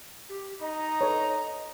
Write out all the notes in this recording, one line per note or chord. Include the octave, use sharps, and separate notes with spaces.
G4
D#4 D#5 A#5
A4 B4 C#5